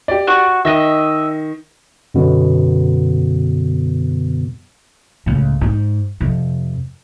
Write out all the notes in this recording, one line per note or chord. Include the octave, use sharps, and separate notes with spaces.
G4 D5
F#4 C#6
D#3 D#5 E5 A#6
F#2 B2 D3 F#3 B3
C#2 A2
G#2
F2 C3